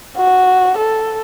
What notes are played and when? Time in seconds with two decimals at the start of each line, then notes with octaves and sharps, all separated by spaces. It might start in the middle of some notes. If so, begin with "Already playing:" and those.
0.17 F#4
0.78 A4